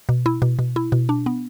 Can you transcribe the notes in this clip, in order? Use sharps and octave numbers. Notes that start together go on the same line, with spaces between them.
B2
E4
B2
B2
E4
B2
D4
B3